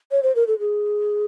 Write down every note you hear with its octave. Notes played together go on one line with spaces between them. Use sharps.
C#5
C5
A#4
A4
G#4